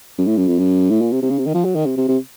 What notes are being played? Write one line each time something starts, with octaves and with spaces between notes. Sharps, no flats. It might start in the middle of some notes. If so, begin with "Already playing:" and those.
F#2
A2
F#2
F2
F#2
A2
A#2
C3
C3
C#3
C3
D#3
F3
F#3
D#3
C3
C3
C3